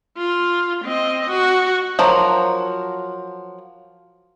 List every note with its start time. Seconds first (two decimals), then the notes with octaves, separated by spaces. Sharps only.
0.17 F4
0.84 C4 D#5
1.29 F#4
1.99 F3 F#3 A#4